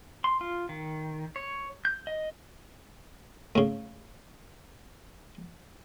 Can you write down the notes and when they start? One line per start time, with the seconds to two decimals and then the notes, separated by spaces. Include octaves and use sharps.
0.24 C6
0.41 F4
0.69 D#3
1.36 C#5
1.85 G6
2.07 D#5
3.55 A2 C#3